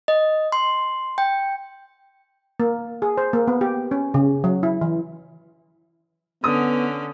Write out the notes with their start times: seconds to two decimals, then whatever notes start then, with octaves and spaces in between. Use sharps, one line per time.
0.08 D#5
0.52 C6
1.18 G5
2.60 A#3
3.02 G#4
3.17 C5
3.33 A#3
3.48 B3
3.61 G4
3.91 C#4
4.14 C#3
4.44 F#3
4.63 E4
4.81 E3
6.44 D3 B3 C#4 D#6